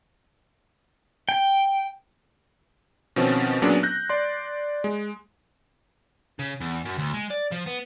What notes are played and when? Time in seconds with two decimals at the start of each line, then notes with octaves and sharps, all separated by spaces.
1.29 G5
3.16 B2 D#3 F3 C4 C#4
3.62 A#2 F#3 B3 C#4 D4 G#4
3.83 F#6 G6 A#6
4.09 D5 C6
4.84 G#3
6.39 C#3
6.61 E2
6.85 F#2
6.98 D2
7.14 G#3
7.30 D5
7.51 F3
7.66 B3